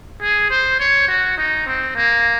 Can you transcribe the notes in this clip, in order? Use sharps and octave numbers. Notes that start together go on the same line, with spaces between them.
G#4
C5
C#5
F#4
D#4
C4
A#3